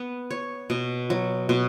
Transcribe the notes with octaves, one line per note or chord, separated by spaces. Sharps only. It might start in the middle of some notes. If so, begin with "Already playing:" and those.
Already playing: B3
C#5
B2
F#3
B2